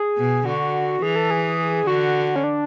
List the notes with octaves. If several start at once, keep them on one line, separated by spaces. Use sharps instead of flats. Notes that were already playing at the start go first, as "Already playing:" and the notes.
Already playing: G#4
B2
D3 F#4
E3 G#4
A4
G#4
D3 F#4
C#4
D4